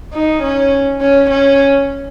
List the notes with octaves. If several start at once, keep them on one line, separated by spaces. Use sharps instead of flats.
D#4
C#4
C#4
C#4